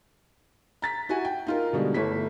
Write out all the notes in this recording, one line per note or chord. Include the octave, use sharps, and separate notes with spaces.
A#5 A6 B6
E4 F#4 G#5
G5
D#4 F4 A#4
B2 D3 G3 G#3
G1 A3 E4 B6